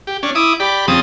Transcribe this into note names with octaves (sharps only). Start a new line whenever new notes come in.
G4
C#4 D4
E4 D6 D#6
G4 D5 B5
F2 C#3 C4 A5 D#6